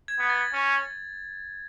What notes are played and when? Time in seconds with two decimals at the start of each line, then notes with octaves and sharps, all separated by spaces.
0.08 G#6
0.19 B3
0.30 A6
0.53 C#4